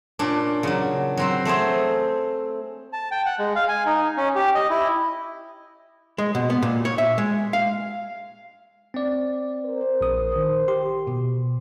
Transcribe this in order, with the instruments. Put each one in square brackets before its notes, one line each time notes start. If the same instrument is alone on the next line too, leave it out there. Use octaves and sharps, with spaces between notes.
[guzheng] A#2 C#4 D4
C#3 F#3
F#3 C4 C5
A3 C4 G#4 C5
[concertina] A5
G5
F#5
G#3
F5
G#5
D#4
C#4
G4
D#5
E4
[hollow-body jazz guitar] G#3
B2
B3
A#2
C#5
E5
G#3
F5
[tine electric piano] C4 D5
[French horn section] A#4 C5
[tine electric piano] A#1 D#6
D#3
G4 C6
B2